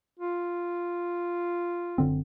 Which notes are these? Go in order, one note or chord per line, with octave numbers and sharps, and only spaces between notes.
F4
F#1 D3 C4